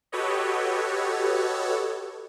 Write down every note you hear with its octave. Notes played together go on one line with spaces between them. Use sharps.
F#4 G4 A4 B4 C#5 D#5